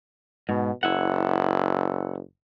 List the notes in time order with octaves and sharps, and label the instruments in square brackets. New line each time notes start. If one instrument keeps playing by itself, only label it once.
[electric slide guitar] G#2 [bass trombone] B2
[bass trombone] F#1 [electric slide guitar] E4 F#5